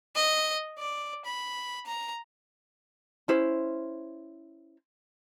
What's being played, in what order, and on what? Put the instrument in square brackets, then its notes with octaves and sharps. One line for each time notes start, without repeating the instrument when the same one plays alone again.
[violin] D#5
D5
B5
A#5
[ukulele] C#4 E4 C5